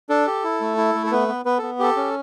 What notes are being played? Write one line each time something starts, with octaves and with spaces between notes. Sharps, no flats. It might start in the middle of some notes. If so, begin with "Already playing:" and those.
D4 A4
G4
E4
A3
E4
A3
A4
B3 B4
B3
B3 B4
B3 A4
G4 A4
C#4